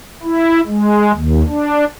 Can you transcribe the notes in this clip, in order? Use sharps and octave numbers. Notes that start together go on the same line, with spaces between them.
E4
G#3
D#2
D4